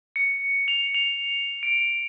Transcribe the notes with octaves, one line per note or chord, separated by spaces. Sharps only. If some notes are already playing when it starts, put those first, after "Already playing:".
C#7
F7
F7
D7